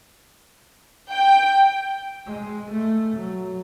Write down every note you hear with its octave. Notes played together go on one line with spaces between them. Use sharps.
G5
G#3
A3
F#3